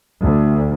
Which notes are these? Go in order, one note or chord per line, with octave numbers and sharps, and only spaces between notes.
D2